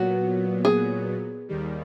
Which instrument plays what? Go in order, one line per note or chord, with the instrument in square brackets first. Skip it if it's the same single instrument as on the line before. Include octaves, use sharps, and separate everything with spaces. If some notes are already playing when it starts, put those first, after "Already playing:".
Already playing: [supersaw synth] A#2 F#3 B3 [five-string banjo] F#4
[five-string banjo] G#4
[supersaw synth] D#2 D#3 G3